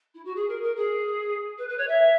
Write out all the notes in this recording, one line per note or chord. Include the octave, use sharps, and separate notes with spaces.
E4
F#4
G#4
A#4
A#4
G#4
B4
B4
C#5
E5